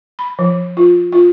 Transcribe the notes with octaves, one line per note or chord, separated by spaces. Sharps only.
B5
F3
F4
F4